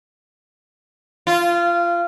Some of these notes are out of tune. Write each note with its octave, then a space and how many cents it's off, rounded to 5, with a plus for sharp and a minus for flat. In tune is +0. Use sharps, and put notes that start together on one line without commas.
F4 -20